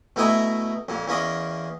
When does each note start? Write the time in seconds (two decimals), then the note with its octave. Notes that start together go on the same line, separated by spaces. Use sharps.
0.16 B2 A3 E4 D#5 G#5 A#5
0.88 F2 A#2
1.08 E2 A#3 C#4 D#5